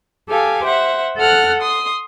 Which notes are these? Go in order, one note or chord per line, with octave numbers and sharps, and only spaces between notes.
G4 A4 F5 G#5
C5 E5 F#5
A4 F#5 F6 F#6
C6 D#6